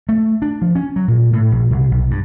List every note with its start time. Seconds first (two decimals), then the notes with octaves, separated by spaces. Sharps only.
0.09 A3
0.42 D4
0.62 F3
0.75 C#4
0.96 F#3
1.08 A#2
1.33 A2
1.52 A#1
1.71 C2
1.91 B1
2.11 G2